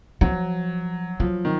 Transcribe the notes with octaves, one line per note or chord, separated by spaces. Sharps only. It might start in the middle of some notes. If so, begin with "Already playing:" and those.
F3 F#3
F3 F#3
D#3